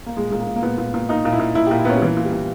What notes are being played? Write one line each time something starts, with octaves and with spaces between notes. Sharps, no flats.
A#3
A#2 G#3
A#2 G#3
A#3
A#2
A#3
A#2 B3
A#2
A#2
A#2 D#4
A#2
E4
A#2
A#2 E4
A#2 G4
E4
A#2 B3 C#4
G3
A#2 E3
A#2
G3
A#2